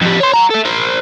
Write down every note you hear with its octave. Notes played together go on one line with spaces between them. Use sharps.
F2 G3
C#5 C6
F#5 A#5
A4 E5
A#4 C5